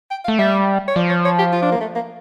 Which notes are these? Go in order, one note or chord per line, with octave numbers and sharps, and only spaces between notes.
G5
F5
A3
G3 E5
C#5
F3 D5
C#5
C#5
G4
F4
D4
A#3
A3
A#3